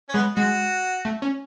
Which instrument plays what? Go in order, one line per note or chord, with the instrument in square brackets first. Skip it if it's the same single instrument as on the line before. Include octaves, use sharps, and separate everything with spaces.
[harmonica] C#4
[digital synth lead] G#3 [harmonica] B3
[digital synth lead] G#3 [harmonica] F#4
[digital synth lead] A3
C#4